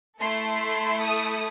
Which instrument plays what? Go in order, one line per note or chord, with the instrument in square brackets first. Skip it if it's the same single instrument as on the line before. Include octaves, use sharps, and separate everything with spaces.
[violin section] A3 E4 A4 C6
D#6